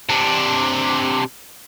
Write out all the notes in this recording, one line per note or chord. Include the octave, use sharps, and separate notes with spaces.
C3 D4